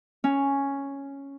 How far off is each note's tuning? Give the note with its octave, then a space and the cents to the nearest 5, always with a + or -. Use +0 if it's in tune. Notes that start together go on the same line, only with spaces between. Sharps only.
C#4 +0